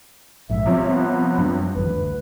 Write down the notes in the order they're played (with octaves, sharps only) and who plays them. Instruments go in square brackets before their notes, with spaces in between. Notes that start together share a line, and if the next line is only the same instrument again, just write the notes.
[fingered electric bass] A#1 G#2 [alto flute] E5
[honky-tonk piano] C3 F3 C#4 [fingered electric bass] G3
[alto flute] B3
[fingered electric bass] F#2 G3 D4
[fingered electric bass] A1 F#2 D#3 [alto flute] B4
[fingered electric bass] D2